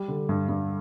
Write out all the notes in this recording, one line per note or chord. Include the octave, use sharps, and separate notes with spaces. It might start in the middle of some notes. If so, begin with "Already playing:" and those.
Already playing: G3
D3
G2
G2